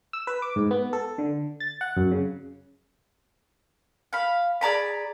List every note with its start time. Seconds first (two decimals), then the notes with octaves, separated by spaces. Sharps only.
0.13 E6
0.27 B4
0.42 D6
0.56 G#2
0.71 B3
0.93 A4
1.18 D3
1.60 A6
1.81 F#5
1.97 F#2
2.12 C#3
4.13 F5 B5
4.61 G#4 D5 A#5 B5